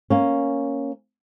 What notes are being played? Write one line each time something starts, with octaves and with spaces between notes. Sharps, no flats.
A#3 C#4